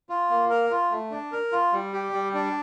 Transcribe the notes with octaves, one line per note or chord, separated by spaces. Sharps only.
F4
A#3
A#4
F4
A3
D4
A#4
F4
G3
G4
G3
D4